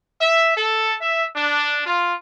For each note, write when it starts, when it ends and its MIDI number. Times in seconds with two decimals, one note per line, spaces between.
0.21 0.54 76
0.57 0.96 69
1.01 1.25 76
1.36 1.81 62
1.87 2.15 65